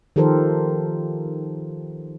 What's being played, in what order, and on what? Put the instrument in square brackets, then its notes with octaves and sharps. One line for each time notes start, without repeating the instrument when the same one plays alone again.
[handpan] D#3 F3 G4 A4 A#4 C5